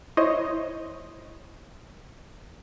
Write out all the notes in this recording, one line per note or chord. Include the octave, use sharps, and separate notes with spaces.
E4 C5 C#5 D#5